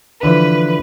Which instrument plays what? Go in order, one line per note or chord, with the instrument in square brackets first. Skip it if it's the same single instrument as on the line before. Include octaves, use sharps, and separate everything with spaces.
[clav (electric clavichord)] D3 E3 F3 [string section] B4